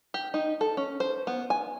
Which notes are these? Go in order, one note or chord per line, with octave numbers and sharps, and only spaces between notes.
G4
D#4
A4
C#4
C5
B3
G#5